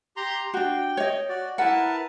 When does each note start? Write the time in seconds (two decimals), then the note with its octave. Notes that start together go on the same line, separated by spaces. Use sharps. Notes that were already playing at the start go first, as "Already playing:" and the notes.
0.17 G4 A#5 C6
0.54 D4 F#4 G5
0.97 C#5 D#5
1.29 F#4 D5
1.58 E4 A#4 B4 F#5 A5